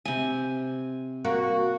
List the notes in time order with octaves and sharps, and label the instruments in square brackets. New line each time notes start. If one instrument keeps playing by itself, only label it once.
[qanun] C3 G#5
[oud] A#3 [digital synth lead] F#4